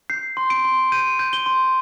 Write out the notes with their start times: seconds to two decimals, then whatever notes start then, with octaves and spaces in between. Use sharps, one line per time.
0.10 G6 C7
0.37 C6
0.50 D7
0.65 C6
0.92 G6 D#7
1.19 G6
1.33 G7
1.46 C6